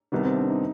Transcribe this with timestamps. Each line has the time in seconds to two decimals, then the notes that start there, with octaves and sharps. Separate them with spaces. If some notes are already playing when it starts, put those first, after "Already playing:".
0.12 C2 C3 D#3 B3
0.24 C4
0.36 D4
0.49 D#4